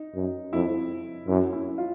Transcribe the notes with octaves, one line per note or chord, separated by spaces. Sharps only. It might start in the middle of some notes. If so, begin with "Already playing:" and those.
Already playing: D#4
F#2
F2 E4
F#2 E4
E4
F4